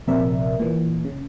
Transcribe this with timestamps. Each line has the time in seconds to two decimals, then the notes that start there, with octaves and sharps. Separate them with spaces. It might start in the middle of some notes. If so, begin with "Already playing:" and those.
0.07 A#1 C3 A#4 D5 E5
0.60 A#2 E3
1.05 C#3